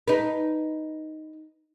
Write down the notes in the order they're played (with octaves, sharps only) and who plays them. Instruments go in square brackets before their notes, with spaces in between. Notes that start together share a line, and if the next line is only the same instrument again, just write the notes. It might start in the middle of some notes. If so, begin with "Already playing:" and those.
[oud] D#4 B4